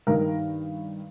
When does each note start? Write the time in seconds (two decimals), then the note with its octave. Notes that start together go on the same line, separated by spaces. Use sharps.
0.07 G2 D#3 A#4